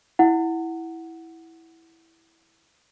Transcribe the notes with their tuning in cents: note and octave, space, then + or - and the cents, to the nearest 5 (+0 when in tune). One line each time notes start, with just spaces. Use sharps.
E4 -5 F#5 +0